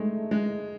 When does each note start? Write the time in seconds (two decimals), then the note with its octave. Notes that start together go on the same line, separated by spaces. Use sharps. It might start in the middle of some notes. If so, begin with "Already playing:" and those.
Already playing: G#3 A3 D#4
0.31 G#3